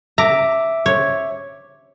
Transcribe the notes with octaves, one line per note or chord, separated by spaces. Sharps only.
E5 A#5 D6
C#5